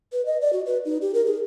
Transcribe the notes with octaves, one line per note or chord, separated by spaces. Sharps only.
B4
D#5
D5
F#4
B4
D#4
G4
A#4
G#4